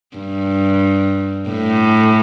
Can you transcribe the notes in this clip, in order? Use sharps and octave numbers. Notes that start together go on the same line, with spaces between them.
G2
A2